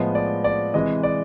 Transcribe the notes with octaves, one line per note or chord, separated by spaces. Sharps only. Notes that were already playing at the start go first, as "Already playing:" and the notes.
Already playing: A2 F3 G#3 B3 D#5
D5
D5
C3 E3 G#3 D#5
D5